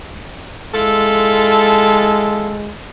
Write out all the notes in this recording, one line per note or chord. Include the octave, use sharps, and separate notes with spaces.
G#3 E4 F4 A4